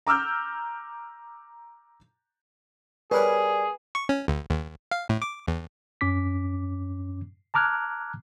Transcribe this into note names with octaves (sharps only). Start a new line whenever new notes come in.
A#5 D6 E6 F6 G6
G3 G#4 A#4 B4 C#5
C#6
C#4
D2
D#2
F5
A2
D6
E2
F#2 C#4 D6 B6
A5 A#5 D6 F6 F#6 G#6